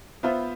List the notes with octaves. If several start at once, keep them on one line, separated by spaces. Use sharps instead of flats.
B3 F4 C5 E5